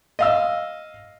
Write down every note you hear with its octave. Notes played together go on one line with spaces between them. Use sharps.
D#5 F5 E6